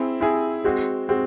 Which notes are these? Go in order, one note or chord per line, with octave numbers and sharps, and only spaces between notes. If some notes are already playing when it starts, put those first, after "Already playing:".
Already playing: C4 E4 G#4
C4 E4 G#4
G#3 C4 F#4
G#3 C4 F#4